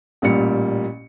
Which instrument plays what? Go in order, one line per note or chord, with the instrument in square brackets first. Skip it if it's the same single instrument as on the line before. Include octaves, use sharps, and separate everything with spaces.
[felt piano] A1 A#2 G3 C#7